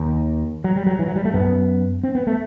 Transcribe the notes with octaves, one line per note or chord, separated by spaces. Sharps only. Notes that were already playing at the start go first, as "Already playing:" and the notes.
Already playing: D#2
F#3
G3
F#3
E3
F#3
G3
A3
F#2 B3
C4
B3
A3